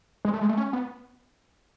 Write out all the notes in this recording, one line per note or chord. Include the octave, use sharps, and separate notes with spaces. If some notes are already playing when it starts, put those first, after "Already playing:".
G#3
A3
G#3
A3
C#4
B3